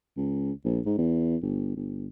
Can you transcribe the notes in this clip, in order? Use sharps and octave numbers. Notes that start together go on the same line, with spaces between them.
C#2
A#1
G#2
E2
G1
G1